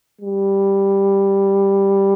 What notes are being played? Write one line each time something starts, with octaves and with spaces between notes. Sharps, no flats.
G3